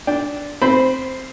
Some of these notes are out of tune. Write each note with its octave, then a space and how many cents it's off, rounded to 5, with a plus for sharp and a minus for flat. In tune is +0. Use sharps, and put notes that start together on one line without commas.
D4 -10 G5 +0
C4 +0 C5 -15 B5 +0